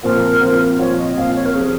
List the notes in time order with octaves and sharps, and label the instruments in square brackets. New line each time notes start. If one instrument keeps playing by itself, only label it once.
[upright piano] A#2 F3 C4 F4 [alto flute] A#4
[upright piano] A#2 F3 C4 F4
[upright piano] A#2 F3 C4 F4 [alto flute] C#5
[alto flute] D#5
[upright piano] A#2 F3 C4 F4 [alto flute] F5
[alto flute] C#5
A#4
[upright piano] C3 F3 [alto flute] G#4